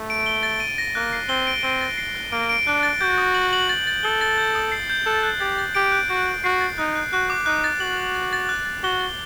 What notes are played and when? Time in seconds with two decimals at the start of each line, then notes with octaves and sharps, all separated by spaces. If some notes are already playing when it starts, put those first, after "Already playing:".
Already playing: A3
0.10 D7
0.26 G7
0.43 A6
0.60 D#7
0.78 A#6
0.95 A#3 F#6
1.13 C7
1.29 C4 G7
1.47 D7
1.63 C4 D#7
1.81 A6
1.98 C7
2.16 F#6
2.32 A#3 D7
2.49 D7
2.67 D4 F#6
2.83 A6
3.01 F#4 G6
3.18 D#6
3.35 F#7
3.53 F#7
3.69 A6
3.87 A6
4.03 A4 G7
4.21 A6
4.38 G6
4.55 D#6
4.72 C7
4.90 G6
5.06 A4 F#6
5.23 F#6
5.40 G4 A6
5.58 A6
5.75 G4 D7
5.92 F#6
6.09 F#4 G6
6.27 G6
6.44 F#4 C7
6.61 A6
6.78 D#4 F#6
6.95 F#6
7.13 F#4 F#6
7.30 D6
7.46 D#4 F#6
7.64 A6
7.80 F#4 F#7
7.98 F#7
8.15 A6
8.33 A6
8.49 F#6
8.66 A6
8.83 F#4 G7
9.01 A6